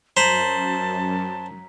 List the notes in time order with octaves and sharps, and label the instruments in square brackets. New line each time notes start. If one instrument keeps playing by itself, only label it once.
[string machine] F#2 [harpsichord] C5 [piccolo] A5 [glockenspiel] A#5 B6 F#7